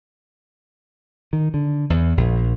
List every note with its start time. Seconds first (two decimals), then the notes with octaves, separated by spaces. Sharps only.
1.33 D#3
1.54 D3
1.90 E2
2.17 A#1